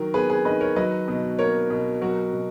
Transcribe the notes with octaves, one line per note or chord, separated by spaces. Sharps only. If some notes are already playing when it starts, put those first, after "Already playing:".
Already playing: D#3 F#3 A#4
B3 G#4 B4
G#4 B4
D#3 B4 D#5
A#4 C#5
F#3 B4 D#5
B2
A#3 A#4 C#5
B2
F#3 F#4 A#4
B2